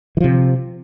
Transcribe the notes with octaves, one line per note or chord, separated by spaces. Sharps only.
C3 E3 F3